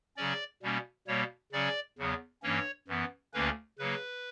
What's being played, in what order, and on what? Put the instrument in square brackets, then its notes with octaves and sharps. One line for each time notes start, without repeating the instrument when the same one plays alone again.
[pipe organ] C#3 F#3 C#4 D5
B2 G3 A#3 C#4
B2 G3 A#3 C#5
C#3 F#3 C#4 D5
E2 C#3 F#3 B3
G2 E3 A#3 C#4 C#5
F#2 E3 B3
D2 D3 A#3 C#4 B4
C#3 F#3 A#3 B4